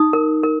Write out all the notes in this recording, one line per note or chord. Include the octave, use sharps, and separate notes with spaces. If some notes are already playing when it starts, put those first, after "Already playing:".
Already playing: D#4 D#6
A#4
A#4